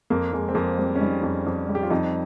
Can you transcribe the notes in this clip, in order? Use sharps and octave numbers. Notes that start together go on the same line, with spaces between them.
F2 A#3
F2 G#3
C4
F2 A#3
G3 C4
C#4
G3 D#4
F2
F2
G3
G4
F4
F2 D#4